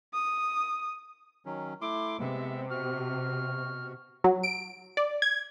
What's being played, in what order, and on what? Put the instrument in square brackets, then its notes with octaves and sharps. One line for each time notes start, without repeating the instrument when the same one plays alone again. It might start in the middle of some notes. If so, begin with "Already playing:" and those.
[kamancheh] D#6
[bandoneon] D#3 F#3 C#4
[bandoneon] A3 E4 C6 [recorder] D6
[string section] C3 [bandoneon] G#3 B3 [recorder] E5
[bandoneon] B2 F#4 [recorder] F6
[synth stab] F#3
D7
D5
G#6